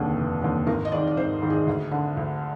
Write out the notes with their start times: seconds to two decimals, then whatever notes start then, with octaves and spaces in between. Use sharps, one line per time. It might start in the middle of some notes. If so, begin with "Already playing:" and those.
Already playing: F1 D#2 D3 G#4
0.17 F1
0.42 D#2 D3
0.67 G#1 A#4
0.85 D#5
0.92 G#2 D#3 D5
1.07 D5
1.17 G#1 C5
1.42 G#2 D#3
1.50 G#4
1.67 D2
1.91 D3
2.17 D2